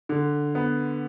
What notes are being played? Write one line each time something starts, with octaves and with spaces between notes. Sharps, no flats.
D3
B3